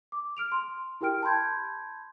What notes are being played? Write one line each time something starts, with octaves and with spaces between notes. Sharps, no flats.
D6
F6 D7 F7
C6
E4 G4 A#4 G5 F6 D7
A5 B5 C6 G6 G#6